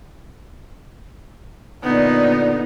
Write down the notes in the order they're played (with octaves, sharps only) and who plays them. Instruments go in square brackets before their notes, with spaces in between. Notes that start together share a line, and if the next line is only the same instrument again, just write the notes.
[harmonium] A#2 D3 [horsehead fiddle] B3 D#4